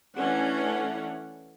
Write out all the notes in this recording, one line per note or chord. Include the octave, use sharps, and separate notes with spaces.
E3 A3 C#4 D4 F#5